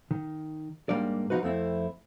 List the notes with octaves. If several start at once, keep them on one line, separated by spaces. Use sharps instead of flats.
D#3
G#2 G3 A#3 D4 D5
F3 D4 D#4 F#4 B4
F2 A3 C4 E4